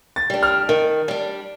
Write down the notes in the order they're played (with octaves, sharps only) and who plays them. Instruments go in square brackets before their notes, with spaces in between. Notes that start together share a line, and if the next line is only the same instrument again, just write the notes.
[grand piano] A6
[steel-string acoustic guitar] G3 D4
[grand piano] F6
[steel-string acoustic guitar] D#3
G3 D4